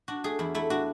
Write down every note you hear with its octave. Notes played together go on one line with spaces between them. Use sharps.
D4 F#4
A3 G#4
E2 E4
A3 E4
D4 F#4